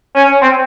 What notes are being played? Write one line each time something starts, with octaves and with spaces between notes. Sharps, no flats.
C#4
C4